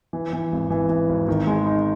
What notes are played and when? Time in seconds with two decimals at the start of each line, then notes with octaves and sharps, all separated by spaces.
0.13 E3
0.33 E3
0.52 G#1
0.70 E3
0.89 E3
1.09 G#1
1.28 D#3
1.47 G#3
1.66 D#4